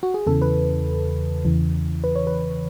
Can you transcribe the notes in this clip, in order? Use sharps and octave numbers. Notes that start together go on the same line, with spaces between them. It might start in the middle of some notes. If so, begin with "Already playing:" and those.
F#4
G#4
E2 C#3 E3 A4
B4
E2 C#3 E3
B4
C#5
B4